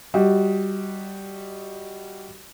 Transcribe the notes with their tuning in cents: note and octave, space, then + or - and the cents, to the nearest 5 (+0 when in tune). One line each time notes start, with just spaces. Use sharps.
G3 -5 F#4 +0 D#5 +15